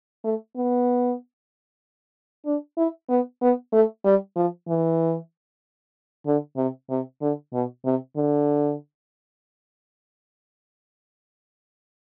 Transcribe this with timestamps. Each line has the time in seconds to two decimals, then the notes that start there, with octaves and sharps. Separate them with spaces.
0.24 A3
0.56 B3
2.46 D4
2.77 E4
3.09 B3
3.41 B3
3.73 A3
4.05 G3
4.36 F3
4.68 E3
6.26 D3
6.57 C3
6.90 C3
7.21 D3
7.53 B2
7.85 C3
8.16 D3